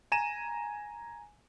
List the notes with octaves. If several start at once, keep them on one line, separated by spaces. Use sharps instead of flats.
G#5 A#5 D#7 E7